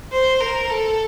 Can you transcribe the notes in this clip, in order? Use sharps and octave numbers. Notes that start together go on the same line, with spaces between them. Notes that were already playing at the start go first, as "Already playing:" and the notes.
C5
A#4
A4